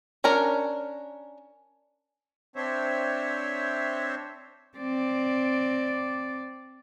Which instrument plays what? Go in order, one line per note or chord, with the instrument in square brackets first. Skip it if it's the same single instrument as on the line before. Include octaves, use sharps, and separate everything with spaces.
[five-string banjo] C#4 D4 A#4 C#5
[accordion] C4 D4 C5 C#5 E5
[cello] C4 D5